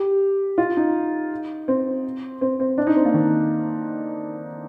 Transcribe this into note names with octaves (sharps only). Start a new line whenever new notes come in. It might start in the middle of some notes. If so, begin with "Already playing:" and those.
Already playing: G4
F4
D#4
C4
C4
C4
D4
D#4
C4
A#3
D#3